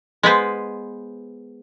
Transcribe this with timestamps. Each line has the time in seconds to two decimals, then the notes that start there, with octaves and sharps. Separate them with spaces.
0.23 G#3 B3 B4 C5